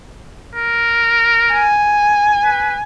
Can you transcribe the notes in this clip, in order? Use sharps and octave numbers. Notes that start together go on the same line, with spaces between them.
A#4
G#5
B4